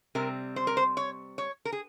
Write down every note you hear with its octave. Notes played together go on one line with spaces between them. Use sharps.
C3 G3 C4 A#4
C5
A#4
C5
C#5
C#5
A#4
G#4